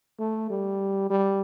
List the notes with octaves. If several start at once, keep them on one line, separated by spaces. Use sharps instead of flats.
A3
G3
G3